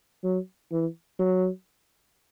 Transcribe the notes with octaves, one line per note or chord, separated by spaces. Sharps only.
F#3
E3
F#3